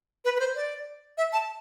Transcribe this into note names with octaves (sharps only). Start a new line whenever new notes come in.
B4
B4
C5
D5
E5
A5